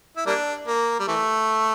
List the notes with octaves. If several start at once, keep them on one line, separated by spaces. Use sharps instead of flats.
E4
G3 A#3 D4
A#3
G3
E3 A3